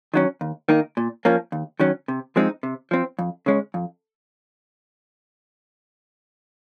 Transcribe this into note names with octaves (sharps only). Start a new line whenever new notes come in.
D#3 F#3 C#4
D#2
D#3 A#3 D#4
A#2
F3 A#3 C#4
D#2
D#3 F#3 C#4
C3
F3 G#3 C4 D#4
C3
F3 C4
F2
C#3 G#3 C#4
F2